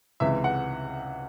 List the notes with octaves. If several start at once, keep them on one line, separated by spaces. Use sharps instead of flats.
C#2 C3 E3 G#3 E5
F#5